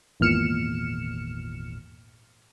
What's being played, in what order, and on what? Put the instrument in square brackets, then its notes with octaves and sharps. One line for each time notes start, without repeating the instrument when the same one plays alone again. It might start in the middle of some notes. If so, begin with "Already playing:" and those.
[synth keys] G#1 E2 A#2 F6 C#7 E7